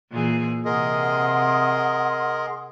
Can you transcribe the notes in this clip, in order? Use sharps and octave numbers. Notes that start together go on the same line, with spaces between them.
A#2 E3 G#4
C3 C4 G#4 A#4 D#5 F#5 C6 D#6